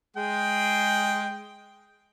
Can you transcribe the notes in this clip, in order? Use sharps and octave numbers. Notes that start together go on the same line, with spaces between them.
G#3 G#4 G5